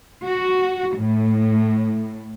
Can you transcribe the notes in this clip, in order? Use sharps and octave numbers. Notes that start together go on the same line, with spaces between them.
F#4
A2